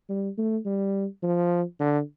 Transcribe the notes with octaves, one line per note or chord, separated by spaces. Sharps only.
G3
A3
G3
F3
D3